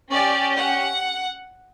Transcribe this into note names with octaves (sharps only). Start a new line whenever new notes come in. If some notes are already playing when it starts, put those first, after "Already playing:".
C#4 G4 D5
F#5